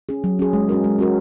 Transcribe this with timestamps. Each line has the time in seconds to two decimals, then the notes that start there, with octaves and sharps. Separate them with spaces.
0.09 C#4 G#4
0.24 F#3
0.39 C#4 G#4
0.53 G#3
0.69 C#4 F#4 A#4
0.84 G#3
0.99 C#4 F#4 A#4